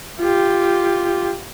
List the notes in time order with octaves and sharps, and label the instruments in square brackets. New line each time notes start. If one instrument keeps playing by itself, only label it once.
[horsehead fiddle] F4 G4